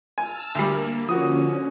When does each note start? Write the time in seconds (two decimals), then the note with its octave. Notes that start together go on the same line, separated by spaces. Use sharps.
0.18 G#5 A5 E6 F6
0.55 D2 G3 A#3
1.09 D3 F3 C#4 F#4 D#6